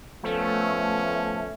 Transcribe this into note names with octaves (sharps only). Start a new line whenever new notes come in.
F3 A3 B3 C#4